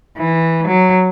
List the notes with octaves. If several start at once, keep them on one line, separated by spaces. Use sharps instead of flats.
E3
F#3